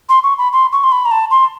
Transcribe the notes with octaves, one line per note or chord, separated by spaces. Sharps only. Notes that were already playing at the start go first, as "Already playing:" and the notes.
C6
C#6
B5
C6
C#6
C6
B5
A#5
A5
C6